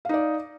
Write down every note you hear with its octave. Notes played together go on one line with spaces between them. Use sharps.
D#4 D5 F5